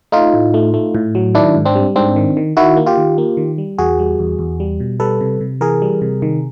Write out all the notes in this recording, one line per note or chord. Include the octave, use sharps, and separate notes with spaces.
A3 D#4 F4
A2
A3
A3
A2
F#3
D#3 D4 E4
G#2
C4 D4
G3
G#2 C4 D4
D#3
D#3
D#3 E4 F#4
A#3
F4 G4
D#3
A#3
D#3
G3
E2 F#4 G#4
G3
E2
E2
G3
B2
G3 A4 B4
C3
C3
E3 G#4 A#4
G3
C3
D#3